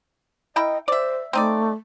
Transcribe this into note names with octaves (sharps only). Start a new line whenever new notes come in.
E4 A#4 D#5 G5
C5 D5 E5
A3 C4 D#4 D5